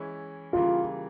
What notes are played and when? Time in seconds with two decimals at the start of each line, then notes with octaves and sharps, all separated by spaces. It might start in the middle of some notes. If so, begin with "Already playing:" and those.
Already playing: E3 G#3 C#4 E4
0.53 C#3 E3 G3 A#3 F4